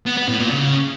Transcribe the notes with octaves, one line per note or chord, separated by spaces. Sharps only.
B3
B3
A2
A#2
C#3